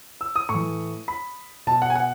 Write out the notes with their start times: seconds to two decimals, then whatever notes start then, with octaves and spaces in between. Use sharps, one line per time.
0.21 E6
0.36 D#6
0.49 A2 C#6
0.54 E3
1.08 B5
1.67 B2 A5
1.82 F#5
1.90 G#5
1.95 F#5